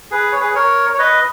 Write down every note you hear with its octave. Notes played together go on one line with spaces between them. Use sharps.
G#4 B4
C#5
G#4 B4
A#4 C#5
C#5
B4 D#5